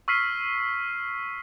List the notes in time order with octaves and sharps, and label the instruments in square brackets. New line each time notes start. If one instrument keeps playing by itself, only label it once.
[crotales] C#6 E6 F6 B6 C7 D#7